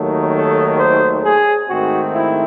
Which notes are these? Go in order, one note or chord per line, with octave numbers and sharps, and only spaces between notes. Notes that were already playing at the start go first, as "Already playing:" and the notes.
Already playing: D#2 D#3 F#3 A3
A4
C5
G#4
G#2 D#3 A3 C4 F#4
E4